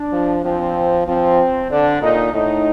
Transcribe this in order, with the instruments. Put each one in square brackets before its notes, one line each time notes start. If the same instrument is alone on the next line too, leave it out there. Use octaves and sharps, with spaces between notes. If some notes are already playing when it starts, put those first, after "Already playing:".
Already playing: [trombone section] D4
[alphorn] F3
[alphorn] F3 [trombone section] C4
[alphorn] F3 [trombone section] C4
[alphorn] D3 [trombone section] D4
[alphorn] A#2 [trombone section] D#4
[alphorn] A2 [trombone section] D#4